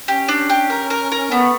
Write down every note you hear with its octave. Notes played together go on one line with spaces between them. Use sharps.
C#4 G4
D4
G4
A#4
A#4
A#4
A3 B3